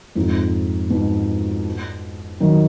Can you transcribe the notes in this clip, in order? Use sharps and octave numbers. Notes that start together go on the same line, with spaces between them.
F2 G#2
G#2 B2
D#3 F#3